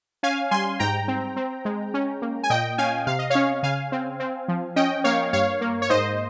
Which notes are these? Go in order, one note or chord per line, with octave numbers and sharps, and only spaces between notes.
C#4 F5 G#5
G3 G#5 C6
G#2 G5 A#5
C4
C4
G#3
C#4
A#3
G#5
A#2 D#5 G5
C#4 F5 G#5
C3 F5
D#5
C#4 C#5 F5
C#3 F5 G#5
C4
C4
F3
C#4 D#5 G5
A#3 C#5 F5
G2 C#5 F5
A#3
C#5
G#2 C5 D#5